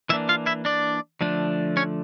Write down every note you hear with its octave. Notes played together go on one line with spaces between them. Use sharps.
E3 A#3 D4 E4 E5
F4 F5
E4 E5
D4 D5
D3 F3 A3 D4
C#4 C#5